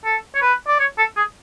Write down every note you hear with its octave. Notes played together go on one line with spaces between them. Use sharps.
A4
C#5
B4
D5
C#5
A4
G#4